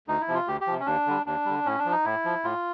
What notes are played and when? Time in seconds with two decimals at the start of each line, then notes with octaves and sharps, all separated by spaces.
0.08 D2 D#4
0.21 E4
0.28 C3 F3
0.35 F4
0.48 D2 G4
0.61 G4
0.67 C3 F3
0.80 C#4
0.86 D#2 D4
1.07 D3 G3
1.26 D#2 D4
1.45 D3 G3
1.66 A2 C#4
1.79 D4
1.85 F3
1.92 D#4
2.05 A2 E4
2.25 F3
2.44 A2 F4